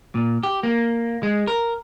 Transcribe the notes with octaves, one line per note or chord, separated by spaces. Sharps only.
A#2
G4
A#3
G#3
A#4